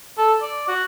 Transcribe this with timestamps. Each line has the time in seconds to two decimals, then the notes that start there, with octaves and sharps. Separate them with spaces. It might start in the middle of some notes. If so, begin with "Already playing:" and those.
0.18 A4
0.42 D5
0.68 F#4